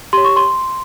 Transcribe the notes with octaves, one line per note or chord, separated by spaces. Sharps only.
G4 C#5 C6
C#6
C6